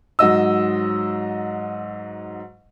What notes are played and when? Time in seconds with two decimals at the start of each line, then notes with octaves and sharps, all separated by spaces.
0.19 G#2 F#3 D#5 E6